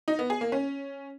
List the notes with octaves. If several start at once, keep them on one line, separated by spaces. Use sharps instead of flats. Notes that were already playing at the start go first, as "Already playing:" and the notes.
D#4
B3
G#4
A#3
C#4